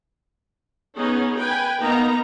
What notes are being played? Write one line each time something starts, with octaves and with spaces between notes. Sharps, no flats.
B3 C#4 D#4 G#4
B4 G5 G#5
A#3 B3 D#4 A#5